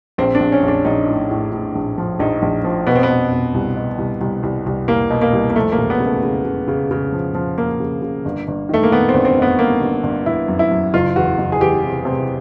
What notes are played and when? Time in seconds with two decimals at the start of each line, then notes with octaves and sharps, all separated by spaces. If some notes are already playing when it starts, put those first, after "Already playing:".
0.18 A#1 C4
0.35 D4
0.40 A#1
0.52 C#4
0.63 A#1
0.68 D4
0.85 A#1 D#4
1.08 A2
1.31 A2
1.52 A2
1.75 A#1
1.98 F3
2.19 A#1 D#4
2.42 A#1
2.64 F3
2.87 B2 B3
2.96 C4
3.03 B3
3.10 B2
3.32 B2
3.54 C2
3.76 B2
3.98 C2
4.21 C2
4.43 C2
4.66 C2
4.88 C2 A#3
5.10 B2
5.22 A#3
5.33 C2
5.50 A#3
5.55 F3 A3
5.72 A#3
5.79 E1
5.90 B3
6.00 C#3
6.06 A3
6.23 C#3
6.45 C#3
6.68 C#3
6.91 C#3
7.12 F3
7.35 F3
7.58 F3 A#3
7.80 C#3
8.02 C#3
8.25 G1
8.48 G1
8.69 D#3 A3
8.83 A#3
8.92 D#3 B3
9.09 C4
9.14 G1
9.25 C4
9.36 D#3
9.42 B3
9.59 G1 A#3
9.81 G1
10.03 G1
10.26 G1 E4
10.48 F#2
10.59 E4
10.71 F#2
10.94 F#1 F4
11.16 E2 F#4
11.38 F#1
11.52 G#4
11.61 E2 G4
11.84 C3
12.05 C3